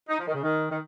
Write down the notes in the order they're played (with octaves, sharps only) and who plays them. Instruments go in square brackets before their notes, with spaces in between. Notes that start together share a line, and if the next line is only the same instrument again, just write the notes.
[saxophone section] D#4
F3
D#3
C#3
D#3
D#3